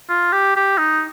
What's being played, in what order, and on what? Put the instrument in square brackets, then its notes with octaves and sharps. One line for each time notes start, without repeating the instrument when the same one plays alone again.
[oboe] F4
G4
G4
D#4